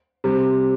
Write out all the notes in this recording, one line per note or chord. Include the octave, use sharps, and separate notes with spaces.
C3 G3